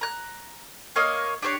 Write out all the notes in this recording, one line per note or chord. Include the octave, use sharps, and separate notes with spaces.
A#5 F#6
A#3 C#5 D#5 F5
D4 G4 C5 C#5